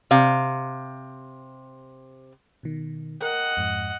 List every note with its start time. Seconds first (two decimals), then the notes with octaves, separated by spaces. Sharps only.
0.11 C3 F5
2.63 B2 D#3
3.21 A#4 D#5 F#5 G5
3.57 F2 G#2